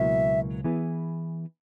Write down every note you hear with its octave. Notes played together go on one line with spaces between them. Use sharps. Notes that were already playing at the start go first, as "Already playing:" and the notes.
Already playing: C#2 B2 F#3 A#3 E4 E5
E3 B3 E4 G#4 B4